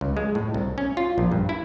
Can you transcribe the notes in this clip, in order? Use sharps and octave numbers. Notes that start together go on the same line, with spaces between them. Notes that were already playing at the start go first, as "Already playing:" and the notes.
C#2
G#3
A2
C2
C#4
F4
A#1
G2
E4